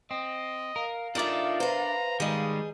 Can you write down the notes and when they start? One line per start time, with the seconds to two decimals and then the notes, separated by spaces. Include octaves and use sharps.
0.11 C4 D#5
0.76 A#4 F5
1.15 D4 D#4 F4 A4 A#4 D5 E5
1.60 B4 C5 A#5
2.20 D#3 G3 G#3 G#4 D#5